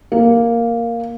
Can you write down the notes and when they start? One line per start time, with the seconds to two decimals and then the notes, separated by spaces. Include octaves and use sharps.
0.12 A#3